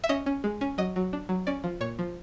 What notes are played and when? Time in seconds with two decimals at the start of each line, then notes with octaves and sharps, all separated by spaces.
0.04 E5
0.09 C#4 D#5
0.26 C#4
0.44 G#3
0.61 C#4
0.78 F#3 D#5
0.96 F#3
1.13 D4
1.29 F#3
1.47 C#4 D5
1.64 F3
1.81 A#2 C#5
1.99 F3